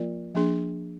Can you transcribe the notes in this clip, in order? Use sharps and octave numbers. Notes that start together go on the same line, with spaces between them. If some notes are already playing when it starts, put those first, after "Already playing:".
Already playing: F3 A#3 F4 A#4 D5
F3 A#3 D4 G#4